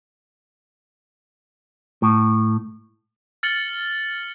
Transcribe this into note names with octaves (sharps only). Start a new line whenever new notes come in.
A2
F6 A6 C#7 F#7 G7